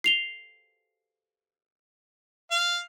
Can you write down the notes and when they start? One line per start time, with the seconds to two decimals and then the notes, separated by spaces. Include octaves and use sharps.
0.04 C7 F7 G7
2.51 F5